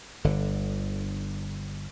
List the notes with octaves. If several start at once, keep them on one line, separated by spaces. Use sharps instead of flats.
G1 D3